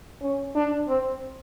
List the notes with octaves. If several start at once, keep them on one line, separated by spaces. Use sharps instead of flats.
C#4
D4
C4